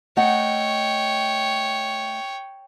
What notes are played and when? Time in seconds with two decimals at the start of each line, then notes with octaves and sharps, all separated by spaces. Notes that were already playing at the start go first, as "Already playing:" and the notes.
0.17 A3 C#5 D#5 F#5 G5